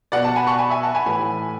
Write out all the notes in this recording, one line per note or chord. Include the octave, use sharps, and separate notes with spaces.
B2 D5 F#5
F#5 A5
G#5 B5
A5 C#6
G#5 B5
E5 G#5
F#5 A5
G#5 B5
A2 E3 G#5 B5